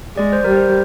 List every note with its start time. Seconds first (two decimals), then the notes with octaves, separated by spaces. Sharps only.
0.16 G#3 D5
0.33 C5
0.44 G3 A#4
0.56 C5